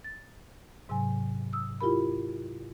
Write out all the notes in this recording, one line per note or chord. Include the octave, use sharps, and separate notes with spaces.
A6
G#2 C3 F#3 G#5
D#6 E6
E4 F4 G4 A#4 B5